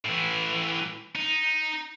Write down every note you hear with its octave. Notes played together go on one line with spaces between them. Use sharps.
A2 E3
D#4